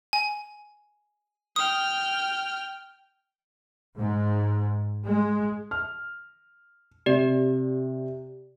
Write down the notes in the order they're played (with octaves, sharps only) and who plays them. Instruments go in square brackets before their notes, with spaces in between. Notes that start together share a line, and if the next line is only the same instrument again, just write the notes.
[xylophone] G#5
[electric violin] G5 F6 [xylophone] D#6
[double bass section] G#2
G#3
[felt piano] F6
[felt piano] C3 [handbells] G4 D5